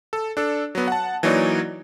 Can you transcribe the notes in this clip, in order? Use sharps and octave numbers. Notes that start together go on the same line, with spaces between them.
A4
D4 A4
F#3 B3
F#5 A5
E3 F#3 A#3 D#4 C#5 D5